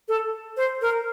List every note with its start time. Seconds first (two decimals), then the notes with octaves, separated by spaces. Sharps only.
0.08 A4
0.57 C5
0.81 A#4